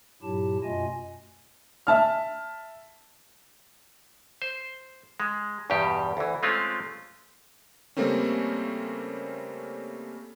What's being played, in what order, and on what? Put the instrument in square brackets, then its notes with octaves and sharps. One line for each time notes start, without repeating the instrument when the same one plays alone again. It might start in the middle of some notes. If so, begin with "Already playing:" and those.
[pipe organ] G2 A#2 F#3 E4 G4 A5
F#2 B2 A3 F4 D#5 G#5
[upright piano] E5 A5 F6
[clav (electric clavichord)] C5
G#3
E2 G2 B2 G4
D2 E3
G#3 A3 C4 C#4 F4
[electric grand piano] C#3 G3 A3 A#3 C4 C#4